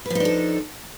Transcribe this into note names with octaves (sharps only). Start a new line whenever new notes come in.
F3 D4 D#4 A4 B4